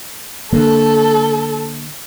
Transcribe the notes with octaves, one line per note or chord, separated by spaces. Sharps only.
D3 A#3 A4